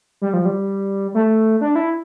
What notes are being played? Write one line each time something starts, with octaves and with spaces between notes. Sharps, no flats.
G3
F3
G3
A3
D4
E4